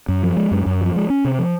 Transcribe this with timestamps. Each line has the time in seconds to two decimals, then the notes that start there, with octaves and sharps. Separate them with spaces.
0.08 F#2
0.23 F3
0.37 G#3
0.51 F#2
0.66 F#2
0.81 F3
0.96 G#3
1.10 C#4
1.25 C3
1.39 F3